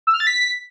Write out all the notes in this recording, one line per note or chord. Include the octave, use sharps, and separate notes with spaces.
E6
F6
A6
B6